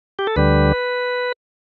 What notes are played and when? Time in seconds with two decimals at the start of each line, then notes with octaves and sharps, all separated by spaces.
0.19 G4
0.27 A4
0.36 D2 D3 G3 B4